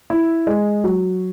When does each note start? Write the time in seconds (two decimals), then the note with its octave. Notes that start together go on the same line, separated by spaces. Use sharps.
0.10 E4
0.47 G#3
0.84 F#3